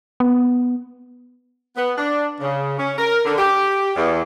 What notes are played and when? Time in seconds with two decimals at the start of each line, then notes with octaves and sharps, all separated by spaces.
0.20 B3
1.75 B3
1.97 D4
2.40 C#3
2.77 C#4
2.98 A#4
3.25 D3
3.38 G4
3.96 E2